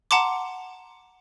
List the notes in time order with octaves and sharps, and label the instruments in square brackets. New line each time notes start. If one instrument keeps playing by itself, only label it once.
[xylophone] F#5 A5 A#5 C6 D6